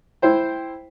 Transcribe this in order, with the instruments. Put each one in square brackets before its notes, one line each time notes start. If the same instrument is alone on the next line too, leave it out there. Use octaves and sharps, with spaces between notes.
[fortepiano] E4 C5 G5